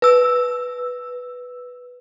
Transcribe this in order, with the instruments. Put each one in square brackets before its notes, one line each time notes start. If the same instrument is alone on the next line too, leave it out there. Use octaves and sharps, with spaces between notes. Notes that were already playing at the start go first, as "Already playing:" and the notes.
[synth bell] B4 E6